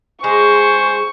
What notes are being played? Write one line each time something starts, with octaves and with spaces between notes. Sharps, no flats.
G#3 G#4 C5 G#5 C#6